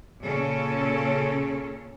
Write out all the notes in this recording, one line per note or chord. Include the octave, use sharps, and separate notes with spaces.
A#2 C#3 C#4 A4